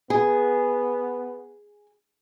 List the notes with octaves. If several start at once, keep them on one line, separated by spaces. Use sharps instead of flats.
B3 G#4